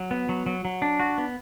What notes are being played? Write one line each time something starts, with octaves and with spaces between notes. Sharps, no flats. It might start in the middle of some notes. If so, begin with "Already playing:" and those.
Already playing: F#3
B3
F#3
F#3
F#3
D4
F#4
B3